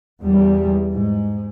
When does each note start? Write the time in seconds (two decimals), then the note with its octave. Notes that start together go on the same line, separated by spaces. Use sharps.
0.21 E2 G3
0.91 G#2